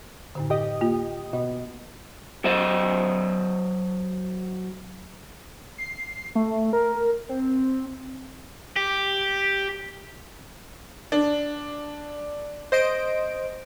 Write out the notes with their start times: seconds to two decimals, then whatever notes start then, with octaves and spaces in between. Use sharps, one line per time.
0.35 F#2 A2 D3
0.50 G4 D#5
0.81 A#3 F4
1.33 B2 D#5
2.44 F#3 C5 D#5
5.78 C7
6.35 A3
6.73 A#4
7.29 C4
8.76 G4
11.12 D4
12.72 C5 D#5 D7